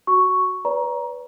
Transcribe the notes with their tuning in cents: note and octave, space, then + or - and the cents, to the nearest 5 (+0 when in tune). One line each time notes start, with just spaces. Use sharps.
F#4 +0 C#6 +5
B4 +0 D5 -40 A#5 +20